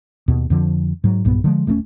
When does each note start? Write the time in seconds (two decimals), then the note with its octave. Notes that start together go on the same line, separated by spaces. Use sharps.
0.28 D#2 B2
0.50 F2 D3 F3
1.04 G#2 F#3
1.25 B1 G2 A#2 B3
1.44 D3 F3 G#3
1.67 D#1 A3 B3 C#4